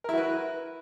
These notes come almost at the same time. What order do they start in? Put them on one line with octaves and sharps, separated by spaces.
A#4 E4 F#4 B4